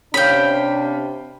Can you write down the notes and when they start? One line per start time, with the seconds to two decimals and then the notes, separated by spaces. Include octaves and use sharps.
0.14 C3 C#4 D4 F5 G5 B5